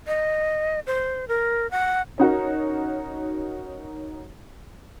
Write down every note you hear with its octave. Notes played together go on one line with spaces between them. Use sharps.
D#5
C5
A#4
F#5
C#4 D#4 F#4 A#4